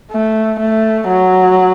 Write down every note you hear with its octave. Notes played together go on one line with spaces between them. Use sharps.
A3
A3
F#3